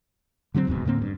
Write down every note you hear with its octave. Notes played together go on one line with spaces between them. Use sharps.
D3 F#3 B3 C4
D#1 D#2 G#2 B2
A2 D3 A#3 C4
G2